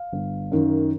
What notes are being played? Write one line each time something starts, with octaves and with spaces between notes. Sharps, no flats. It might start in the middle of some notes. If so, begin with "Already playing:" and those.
Already playing: F5
G1
F#2 D#3